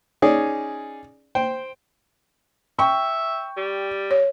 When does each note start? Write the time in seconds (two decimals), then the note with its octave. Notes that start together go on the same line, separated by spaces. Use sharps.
0.22 C#4 D#4 G#4 D5
1.35 C5 G5
2.79 E5 G5 C#6
3.57 G3
4.11 C#5